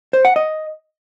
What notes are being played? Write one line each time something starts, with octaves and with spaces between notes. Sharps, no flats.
C5
F#5
D#5